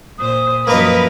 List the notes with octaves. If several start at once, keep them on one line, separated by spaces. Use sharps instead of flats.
A#2 C5 D#6
F#2 F3 A#3 A#4 B4 D#5